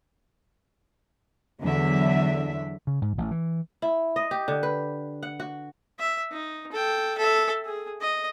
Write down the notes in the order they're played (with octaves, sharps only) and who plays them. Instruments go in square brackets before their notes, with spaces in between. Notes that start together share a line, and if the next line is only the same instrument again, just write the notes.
[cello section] E2 D3 F#3 D4 E5
[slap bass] C#3
G#2
A1
E3
[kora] E4
D#5
G4
D3
B4
F#5
F#4
[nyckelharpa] E5
D#4
A4 G5
A4 E5
G#4
D#5